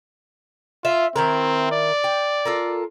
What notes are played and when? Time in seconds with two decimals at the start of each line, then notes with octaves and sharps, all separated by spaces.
0.85 F4 E5
1.16 D#3 C4 E4 A#4
1.72 D5
2.04 G5
2.45 F4 A4 A#4